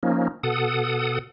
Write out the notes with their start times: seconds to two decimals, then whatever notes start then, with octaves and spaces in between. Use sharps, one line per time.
0.03 F3 A#3 C#4 D#4
0.43 B2 A4 F#5 D#6